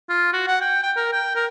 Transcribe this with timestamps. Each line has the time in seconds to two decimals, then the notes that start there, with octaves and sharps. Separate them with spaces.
0.09 F4
0.33 F#4
0.47 F#5
0.61 G5
0.83 G5
0.97 A#4
1.13 G5
1.35 A#4